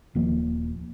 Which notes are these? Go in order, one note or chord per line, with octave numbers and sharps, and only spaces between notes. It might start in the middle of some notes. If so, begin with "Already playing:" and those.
D#1 D#3 F3 A#3